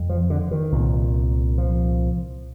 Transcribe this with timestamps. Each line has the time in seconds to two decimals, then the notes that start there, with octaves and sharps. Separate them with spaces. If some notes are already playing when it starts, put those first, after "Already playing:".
Already playing: F2 C3
0.09 F3
0.30 D3
0.51 D#3
0.72 C2 A#2
1.58 F3